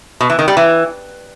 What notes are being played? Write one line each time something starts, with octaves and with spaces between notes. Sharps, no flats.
B2
E3
D#3
G3
E3